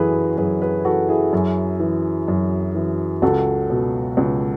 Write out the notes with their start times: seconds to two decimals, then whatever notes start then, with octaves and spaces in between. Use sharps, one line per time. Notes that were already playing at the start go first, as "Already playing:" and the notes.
Already playing: F#2 E3 F#4 G#4 A4 B4
0.37 F#2 G#4 B4
0.62 G#4 B4
0.85 E3 F#4 A4
1.09 E4 G#4
1.33 F#2
1.80 E3
2.28 F#2
2.75 E3
3.22 C#2 F#4 A4
3.70 B2
4.17 C#2